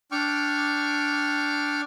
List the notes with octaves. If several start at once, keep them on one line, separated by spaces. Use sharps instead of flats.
D4 G5 C#6 D6 F6